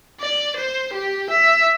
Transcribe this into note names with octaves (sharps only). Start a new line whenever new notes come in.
D5
C5
G4
E5